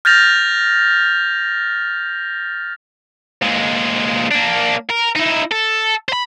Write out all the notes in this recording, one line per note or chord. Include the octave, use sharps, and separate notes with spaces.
F6 G6 A6 A#6 F7
A#2 G#3
A#3 D4
A#4
D#4 E4
A4
C5 B5